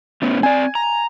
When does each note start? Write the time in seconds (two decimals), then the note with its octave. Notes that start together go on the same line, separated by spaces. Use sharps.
0.22 A2 B3 C#4
0.43 C4 D5 G#5
0.75 A#5